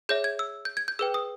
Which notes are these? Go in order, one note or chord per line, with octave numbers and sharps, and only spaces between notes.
G#4 C#5 E5 G6
G#6
E6
G6
G#6
G6
G#4 B4 G5 E6
D#6